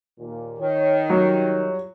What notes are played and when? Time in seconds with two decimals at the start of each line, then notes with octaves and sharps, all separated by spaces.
0.19 D#2 A#2
0.60 D#3 C#5
1.10 F#3 G3 F4 C#5